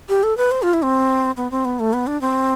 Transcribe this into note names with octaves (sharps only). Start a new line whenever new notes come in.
G4
A4
B4
C5
F4
E4
C4
B3
C4
B3
A3
B3
D4
C4